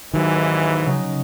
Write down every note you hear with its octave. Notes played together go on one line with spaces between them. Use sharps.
D#2 G#2 D#3 E3 F#3
C#3 F#3 D#4